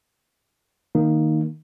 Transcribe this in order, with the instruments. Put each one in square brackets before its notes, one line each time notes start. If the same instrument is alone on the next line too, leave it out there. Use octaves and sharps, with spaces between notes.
[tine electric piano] D#3 A#3 D#4